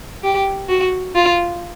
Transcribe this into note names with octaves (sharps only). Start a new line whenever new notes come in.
G4
F#4
F4